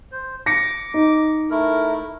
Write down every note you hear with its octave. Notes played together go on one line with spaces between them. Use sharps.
C5
D6 A#6 C#7
D#4
A3 E4 A#4